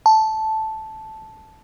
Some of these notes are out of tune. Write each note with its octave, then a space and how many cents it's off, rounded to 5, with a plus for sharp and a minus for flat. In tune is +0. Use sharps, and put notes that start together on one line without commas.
A5 -5